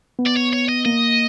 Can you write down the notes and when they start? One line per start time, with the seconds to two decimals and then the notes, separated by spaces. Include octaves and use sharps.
0.19 B3
0.26 D5
0.36 C#5
0.53 C#5
0.69 D#5
0.85 A#3 D#5